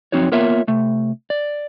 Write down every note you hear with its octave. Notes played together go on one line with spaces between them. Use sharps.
F#2 F3 C4 D#4 F#4 C#5
A#3 B3 F4 A#4 C#5 E5
C3 A3
D5